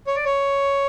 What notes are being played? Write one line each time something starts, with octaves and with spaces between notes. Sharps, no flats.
C#5
D5
C#5